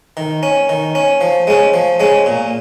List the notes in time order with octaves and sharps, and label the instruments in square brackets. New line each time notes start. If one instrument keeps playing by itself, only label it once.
[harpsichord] D#3
C#4
D#3
C#4
F3
G#3 C#4
F3
G#3 C#4
A#2